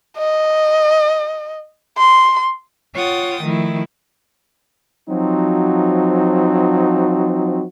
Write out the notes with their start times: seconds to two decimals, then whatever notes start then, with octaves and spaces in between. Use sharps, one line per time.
0.17 D#5
1.98 C6
2.94 F4 C#5 F#5 G5 D#6 A6
3.41 D#3 F3 A3 E4
5.09 F3 F#3 C4 D#4 F#4